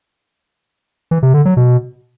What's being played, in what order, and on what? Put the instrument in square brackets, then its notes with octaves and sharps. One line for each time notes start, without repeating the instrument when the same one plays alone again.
[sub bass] E3
C3
D3
F#3
B2